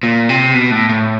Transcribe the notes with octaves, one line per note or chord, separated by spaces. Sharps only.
A#2
C3
B2
A2
A2